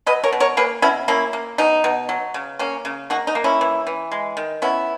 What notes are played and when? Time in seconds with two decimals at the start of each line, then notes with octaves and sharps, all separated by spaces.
0.06 F#3 B4 D#5
0.24 A#4 C#5
0.32 B2
0.40 A#4 C#5
0.57 A#3 G#4 B4
0.82 B2 C#4 E4
1.08 A#3 C#4 E4
1.33 A#3
1.58 B2 D#4
1.84 B2
2.09 F#3
2.34 C#3
2.59 A#3 C#4
2.85 C#3
3.10 A#3 D#4 F#4
3.27 D#4
3.35 A#3
3.44 C#4 E4
3.61 E3
3.87 E3
4.12 G#3
4.37 D#3
4.62 B3 C#4 E4